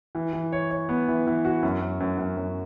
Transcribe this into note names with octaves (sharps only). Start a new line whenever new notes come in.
E3
E3
C#5
C#5
B3
E3
E3
F#4
F#2
F#2
F#2
F#2
F#2